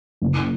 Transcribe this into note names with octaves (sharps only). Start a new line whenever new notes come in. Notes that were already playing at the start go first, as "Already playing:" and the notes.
F#1